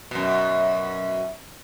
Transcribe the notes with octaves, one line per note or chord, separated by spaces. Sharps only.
F#2 B2